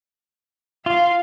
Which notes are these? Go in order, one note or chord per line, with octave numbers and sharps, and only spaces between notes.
F4 F5